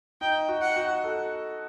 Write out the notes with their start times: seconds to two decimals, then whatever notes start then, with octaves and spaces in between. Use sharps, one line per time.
0.21 D#4 G5
0.48 F#4
0.62 F#5
0.76 F#4
1.04 A4